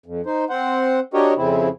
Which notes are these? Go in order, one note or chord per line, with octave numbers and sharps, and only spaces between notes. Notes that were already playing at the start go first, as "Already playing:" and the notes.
F2
D#4 C5
C4 C5 F#5
D4 F#4 G4 A#4 C#5 D#5
F2 C#3 C4 E4